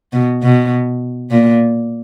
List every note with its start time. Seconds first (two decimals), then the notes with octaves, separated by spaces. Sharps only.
0.13 B2
0.43 B2
1.31 A#2